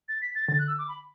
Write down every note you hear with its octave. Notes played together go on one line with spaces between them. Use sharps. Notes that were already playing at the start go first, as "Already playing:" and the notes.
A6
B6
A6
D3 A6
F#6
E6
D6
B5